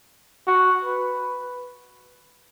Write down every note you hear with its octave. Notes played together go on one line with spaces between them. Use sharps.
F#4
B4